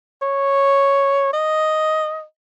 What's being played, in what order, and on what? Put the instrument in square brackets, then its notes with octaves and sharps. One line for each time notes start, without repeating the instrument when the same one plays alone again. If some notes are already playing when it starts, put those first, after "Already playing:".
[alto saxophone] C#5
D#5